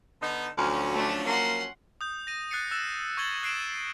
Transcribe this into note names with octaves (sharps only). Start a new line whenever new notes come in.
D3 B3 D#4
D2 F3 F#3 C#4
A3 D4
A#3 F#5 C6
D#6 G6
A#6 D#7
F#6 A6 C7 C#7 D#7
E6 F#6 A6 E7
C#6 F#6 G#6 A6 F#7 G7
F#6 C7 D7 E7